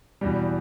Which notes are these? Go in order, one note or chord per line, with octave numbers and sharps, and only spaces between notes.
E2 B2 G3